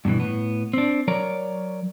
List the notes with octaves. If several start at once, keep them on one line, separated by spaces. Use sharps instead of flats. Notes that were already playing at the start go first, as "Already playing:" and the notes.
G2 B2 D#3 E3
A2 B3
C4 D4
F#3 A#4 C#5 D5 A#5